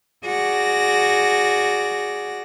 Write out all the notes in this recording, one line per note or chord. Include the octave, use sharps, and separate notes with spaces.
F#4 G#4 D5 A#6